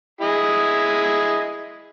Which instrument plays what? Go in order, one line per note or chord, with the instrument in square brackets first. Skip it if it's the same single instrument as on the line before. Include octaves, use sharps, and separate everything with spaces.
[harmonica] E4 G#4 D#5